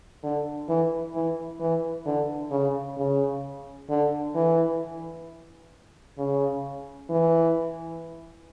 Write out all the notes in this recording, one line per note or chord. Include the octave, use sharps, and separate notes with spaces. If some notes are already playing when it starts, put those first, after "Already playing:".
D3
E3
E3
E3
D3
C#3
C#3
D3
E3
C#3
E3